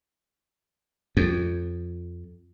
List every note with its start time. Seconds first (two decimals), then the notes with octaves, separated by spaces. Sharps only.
1.17 F2